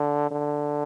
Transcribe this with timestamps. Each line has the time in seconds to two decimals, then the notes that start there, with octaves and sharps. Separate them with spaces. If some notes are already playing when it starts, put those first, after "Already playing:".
Already playing: D3
0.31 D3